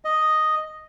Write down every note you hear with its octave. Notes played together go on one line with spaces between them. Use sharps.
D#5